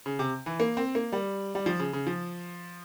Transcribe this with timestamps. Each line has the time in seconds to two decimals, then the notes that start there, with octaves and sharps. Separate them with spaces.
0.06 C#3
0.19 C3
0.46 E3
0.60 A#3
0.77 C4
0.95 A#3
1.12 G3
1.55 G3
1.66 F3
1.79 C#3
1.93 C#3
2.07 F3